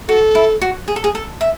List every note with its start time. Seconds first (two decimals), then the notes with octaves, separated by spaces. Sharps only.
0.08 F#4 A4
0.35 E4
0.61 F#4
0.88 G#4
0.96 A4
1.04 G#4
1.15 A4
1.41 E5